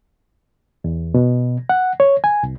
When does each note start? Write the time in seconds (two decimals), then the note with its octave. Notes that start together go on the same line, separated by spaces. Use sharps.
0.84 E2
1.14 B2
1.69 F#5
2.00 C#5
2.24 G#5
2.43 C2